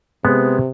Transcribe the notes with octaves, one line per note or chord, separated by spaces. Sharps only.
C3 G#3 B3